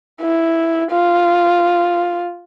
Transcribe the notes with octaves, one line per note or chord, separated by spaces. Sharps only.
E4
F4